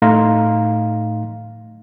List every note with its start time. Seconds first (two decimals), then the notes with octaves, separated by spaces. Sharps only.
0.02 A2 A3 D#4 F5 A#5 C6